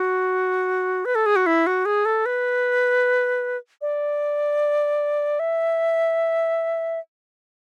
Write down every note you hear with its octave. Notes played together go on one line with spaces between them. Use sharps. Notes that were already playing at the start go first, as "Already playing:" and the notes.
Already playing: F#4
B4
A4
G#4
F#4
E4
F#4
G#4
A4
B4
D5
E5